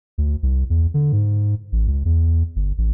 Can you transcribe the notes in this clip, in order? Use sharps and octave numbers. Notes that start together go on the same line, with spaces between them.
D2
C2
E2
D3
G#2
A1
C#2
E2
G1
A1